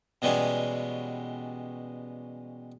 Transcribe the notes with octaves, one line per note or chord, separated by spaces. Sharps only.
B2 E3 G3 G#3 B3 C#4